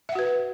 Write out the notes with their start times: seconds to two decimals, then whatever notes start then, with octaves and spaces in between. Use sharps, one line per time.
0.09 E5
0.12 F#5
0.15 F#4
0.19 B4